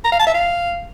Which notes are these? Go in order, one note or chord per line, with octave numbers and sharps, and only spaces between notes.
A#5
F5
A5
E5
F5